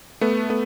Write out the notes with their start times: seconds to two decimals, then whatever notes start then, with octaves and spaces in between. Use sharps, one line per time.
0.21 A3 B3
0.50 A3 B3